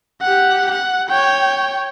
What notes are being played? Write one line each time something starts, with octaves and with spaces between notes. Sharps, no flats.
G4 F#5
F#5
C#5 G5